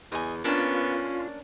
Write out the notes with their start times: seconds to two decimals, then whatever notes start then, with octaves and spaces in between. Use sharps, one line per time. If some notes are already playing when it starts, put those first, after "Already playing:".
0.12 E2 D#5 G#5
0.44 A#3 B3 C#4 D4 F4